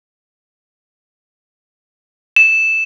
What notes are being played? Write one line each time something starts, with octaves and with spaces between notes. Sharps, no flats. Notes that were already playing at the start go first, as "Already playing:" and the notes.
E7